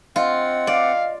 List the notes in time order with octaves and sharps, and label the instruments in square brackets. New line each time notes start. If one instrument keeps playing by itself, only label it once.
[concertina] C4 F#5 [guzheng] F4 [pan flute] D#5
[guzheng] D5 [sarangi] F5